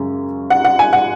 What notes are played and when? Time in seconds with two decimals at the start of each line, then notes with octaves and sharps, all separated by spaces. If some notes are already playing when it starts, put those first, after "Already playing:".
Already playing: F#2 C#3 G#3 C#4
0.50 F#5
0.65 F#5
0.79 G#5
0.93 F#5